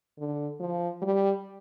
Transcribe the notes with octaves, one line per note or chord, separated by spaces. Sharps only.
D3
F3
G3